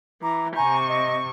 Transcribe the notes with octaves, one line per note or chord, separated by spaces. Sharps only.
E3 A#5 D6
C3 G#5 A#5 C#6 G6
D#5